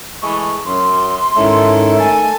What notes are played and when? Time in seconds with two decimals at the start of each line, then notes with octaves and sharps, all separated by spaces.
0.22 E3 G#3 A3 C#6
0.66 F#2 C6
1.36 G#2 D#3 C#4 E4 A4 E5
2.00 A3 G#5 A5